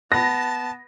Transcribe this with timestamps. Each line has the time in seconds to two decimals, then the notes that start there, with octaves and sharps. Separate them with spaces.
0.12 B3 A5 A#6